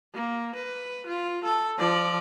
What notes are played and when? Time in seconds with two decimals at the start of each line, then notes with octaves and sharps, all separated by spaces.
0.14 A#3
0.56 B4
1.07 F4
1.44 A4
1.78 F3 D5